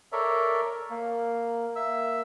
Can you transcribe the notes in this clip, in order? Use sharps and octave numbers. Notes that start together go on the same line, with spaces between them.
A4 A#4 C#5 D5 E5
A#3
A#3 E5 E6